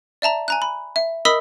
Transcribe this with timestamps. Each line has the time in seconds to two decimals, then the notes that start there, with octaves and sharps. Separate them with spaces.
0.22 D5 E5 A5 A#5
0.48 G#5 A#5 F#6
0.62 B5
0.96 E5
1.25 A#4 D#5 B5 D#6 E6 B6